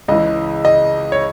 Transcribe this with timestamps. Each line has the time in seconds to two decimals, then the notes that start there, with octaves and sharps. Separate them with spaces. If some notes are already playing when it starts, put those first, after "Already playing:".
0.08 C#2 C#3 E3 D#5
0.65 D#5
1.12 C#5